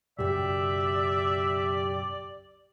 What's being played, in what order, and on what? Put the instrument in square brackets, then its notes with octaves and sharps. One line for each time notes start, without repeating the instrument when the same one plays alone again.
[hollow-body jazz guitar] B1 F#2 C#3 [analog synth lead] G4 [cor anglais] D5 [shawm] E5